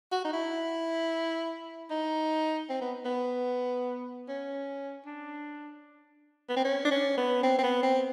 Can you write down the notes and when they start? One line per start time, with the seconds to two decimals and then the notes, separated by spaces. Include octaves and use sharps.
0.12 F#4
0.25 D#4
0.33 E4
1.91 D#4
2.70 C4
2.82 B3
3.06 B3
4.28 C#4
5.06 D4
6.50 B3
6.57 C4
6.65 C#4
6.85 D4
6.91 C#4
7.18 B3
7.43 C4
7.59 C4
7.64 B3
7.83 C4